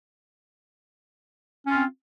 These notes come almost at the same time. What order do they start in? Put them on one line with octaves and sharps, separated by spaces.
C#4 F4 C4